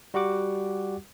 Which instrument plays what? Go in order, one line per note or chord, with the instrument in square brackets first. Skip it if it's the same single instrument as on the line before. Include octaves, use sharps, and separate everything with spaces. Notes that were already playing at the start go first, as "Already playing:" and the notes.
[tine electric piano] G3 F#4 G4 F#5 D6